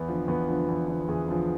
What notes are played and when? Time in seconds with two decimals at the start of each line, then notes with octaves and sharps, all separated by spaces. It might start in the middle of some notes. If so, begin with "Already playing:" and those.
Already playing: E2 B3
0.08 D3 F3
0.28 E2 B3
0.48 D3 F3
0.68 E2
0.88 D3 F3
1.08 E2 G#4
1.28 D3 F3